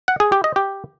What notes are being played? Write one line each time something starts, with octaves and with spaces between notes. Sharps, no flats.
F#5
G#4
G4
D#5
G4